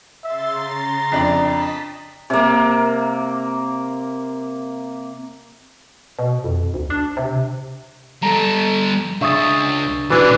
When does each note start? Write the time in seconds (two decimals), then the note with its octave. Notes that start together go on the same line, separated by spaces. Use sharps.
0.24 C#3 E5 C6 A6
0.58 A#5
1.12 F2 D4 D5
1.46 D#5 A5 B6
2.30 C3 A#3
6.19 B2
6.44 F2
6.74 D2
6.90 D4
7.17 C3
8.23 G3 A4 A#5
9.21 C#2 D4 E5 C#6 D#6 A6
10.10 B2 E3 C#4 D4 E4 F#4 B4 F#6